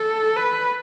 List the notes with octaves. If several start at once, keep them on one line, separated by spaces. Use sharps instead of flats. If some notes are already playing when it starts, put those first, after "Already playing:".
Already playing: A4
B4